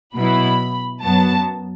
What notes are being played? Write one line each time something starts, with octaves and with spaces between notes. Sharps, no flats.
B2 F#3 B3 E4 B5
F#2 F#3 B3 A5